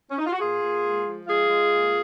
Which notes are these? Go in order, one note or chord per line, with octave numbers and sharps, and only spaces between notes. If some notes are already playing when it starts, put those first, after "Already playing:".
C#4
D#4
F4
F#4
A#2 F4 G#4
A#2
G#3
F3
G#3 F4 G#4
G#3
A#2